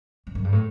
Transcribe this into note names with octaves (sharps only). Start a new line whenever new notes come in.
G2
F#2
G2
A2